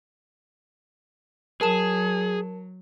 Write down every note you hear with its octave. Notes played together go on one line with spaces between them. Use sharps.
F#3 G#4 A#4 A5 E7